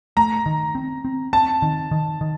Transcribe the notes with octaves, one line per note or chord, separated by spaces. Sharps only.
A3 A#5
D#3
C4
C4
C4 A5
D#3
D#3
D#3